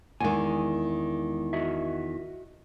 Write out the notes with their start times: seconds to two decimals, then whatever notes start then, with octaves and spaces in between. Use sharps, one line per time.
0.20 E2 D#3 G#3 G#5
1.53 F#4 D#5 E5